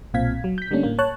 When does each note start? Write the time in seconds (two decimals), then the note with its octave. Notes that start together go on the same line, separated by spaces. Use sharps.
0.14 B1 A#2 C4 F5 G#6 B6
0.44 F#3
0.58 G6 B6
0.71 D3 G3 A3 A#3 C#4 D4
0.83 A2 A#3
0.99 C#5 A5 F#6